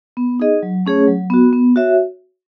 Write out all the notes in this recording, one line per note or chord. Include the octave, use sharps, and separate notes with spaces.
B3
D#4 G#4 D#5
F#3
A3 C#4 G#4 C#5
F#3
B3 F#4
B3
F#4 C#5 E5